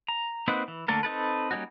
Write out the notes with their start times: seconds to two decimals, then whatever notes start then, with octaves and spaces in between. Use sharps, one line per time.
0.08 A#5
0.48 A#3 C4 D#4 B4 F#5
0.68 E3
0.88 D3 A3 A#3 A4 A#4
1.03 C4 D#4 A4 B4
1.51 G3 A#3 C#4 D#4 F#4